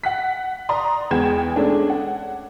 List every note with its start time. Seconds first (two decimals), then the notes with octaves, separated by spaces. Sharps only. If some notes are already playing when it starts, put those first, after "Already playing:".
0.04 F#5 F#6 B6
0.69 D5 A#5 C6 D#6
1.11 E2 G#3 B3 G5 G#6 E7
1.56 G#3 A3 C#4 D4
1.90 F#5